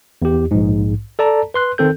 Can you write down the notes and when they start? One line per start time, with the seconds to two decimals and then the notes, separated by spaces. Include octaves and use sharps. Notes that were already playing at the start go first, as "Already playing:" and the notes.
0.22 E2 G4
0.51 A#1 G#2
1.19 A4 D5 A5 A#5
1.54 B4 C6 F#6
1.78 D#3 C4 A4 G6